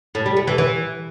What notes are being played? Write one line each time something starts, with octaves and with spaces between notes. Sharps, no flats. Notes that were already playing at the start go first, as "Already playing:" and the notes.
A2
G3
A3
E3
E3